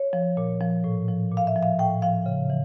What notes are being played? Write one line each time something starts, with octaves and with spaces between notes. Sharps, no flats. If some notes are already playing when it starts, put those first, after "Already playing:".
Already playing: C#5
F3
A#2
F3
A2
F3
A#2
F5
E5
F3
F5
A2 G5
F3 F5
C#3
E3